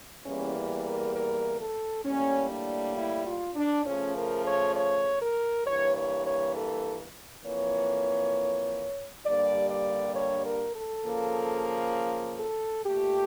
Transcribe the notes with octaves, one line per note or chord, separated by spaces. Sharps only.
E2 E3 G3 A#3 C#4
A#4
A#4
A4
A2 G3 A#3 C#4
D4
E4
F4
D4
C#3 F3 A3 C#4
A#4
C#5
C#5
A#4
G2 E3 A#3 C#5
C#5
C#5
A4
F2 E3 A#3 C#5
G2 D3 G3 A#3 D5
D5
C#5
A#4
A4
C#3 F3 A#3
A4
A#2 A3 G4